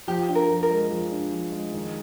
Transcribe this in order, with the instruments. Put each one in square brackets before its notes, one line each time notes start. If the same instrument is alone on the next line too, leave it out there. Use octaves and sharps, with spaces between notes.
[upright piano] F3 [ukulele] G4
[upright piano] D4
[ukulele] A#4
[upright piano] F3
[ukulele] A#4
[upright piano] G#3
F3
D4
F3
G#3
D#3